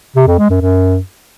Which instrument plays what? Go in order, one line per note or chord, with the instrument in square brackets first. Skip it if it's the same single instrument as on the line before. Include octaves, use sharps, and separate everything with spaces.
[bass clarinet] C3
F2
G#3
F#2
F#2